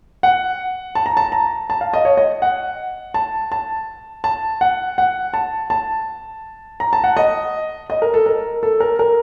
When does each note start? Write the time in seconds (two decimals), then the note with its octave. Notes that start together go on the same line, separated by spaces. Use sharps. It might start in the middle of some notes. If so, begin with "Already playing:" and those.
0.23 F#5
0.95 A5
1.06 A#5
1.17 A5
1.32 A#5
1.70 A5
1.81 F5
1.93 D#5
2.05 C#5
2.17 D#5
2.42 F#5
3.14 A5
3.52 A5
4.24 A5
4.61 F#5
4.98 F#5
5.34 A5
5.70 A5
6.80 A#5
6.93 A5
7.04 F#5
7.17 D#5
7.90 D#5
8.02 A#4
8.14 A4
8.26 A#4
8.63 A4
8.80 A#4
8.99 A#4